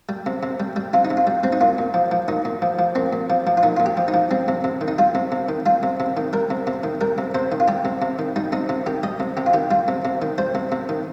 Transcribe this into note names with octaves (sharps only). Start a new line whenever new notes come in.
G3
C3
C3
G3
G3
C3 F4
D#4
C3
F4
G3
G3 C4
D#4
A#2 F4
A#2
F3
F3
A#2 D#4
A#2
F3
F3
A#2 C4
A#2
F3
F3
F4
A#2 D#4
A#2 F4
G4
F3
D#4
F3
G3 C4
C3
C3
D#3
D#4
G3 F4
C3
C3
D#3
G3 F4
C3
C3
D#3
G3 A#4
C3
C3
D#3
G3 A#4
C3
C3 C5
D#3
F4
G3 G4
C3
C3
D#3
G3 D#4
C3 D#4
C3
D#3 G4
G3 D#5
C3
C3 G4
F4
D#3 G4
G3 F4
C3
C3
D#3
G3 C5
C3
C3
D#3